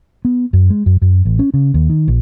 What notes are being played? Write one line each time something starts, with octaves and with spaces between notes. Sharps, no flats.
B3
F#2
G#3
F#2
F#2
A1
C#4
C#3
D#2
D#3
A#1